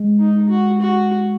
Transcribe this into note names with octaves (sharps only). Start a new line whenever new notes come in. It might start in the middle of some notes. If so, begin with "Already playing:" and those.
Already playing: G#3
D#4
F#4
F#4